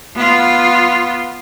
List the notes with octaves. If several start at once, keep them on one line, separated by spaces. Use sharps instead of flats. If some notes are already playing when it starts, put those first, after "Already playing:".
B3 F4